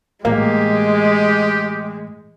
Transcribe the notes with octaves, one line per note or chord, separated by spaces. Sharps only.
A2 E3 G#3 A#3 G4